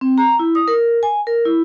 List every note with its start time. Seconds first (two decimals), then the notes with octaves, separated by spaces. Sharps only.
0.01 C4
0.18 A#5
0.39 E4
0.55 D#6
0.68 A#4
1.03 G#5
1.27 A#4
1.45 E4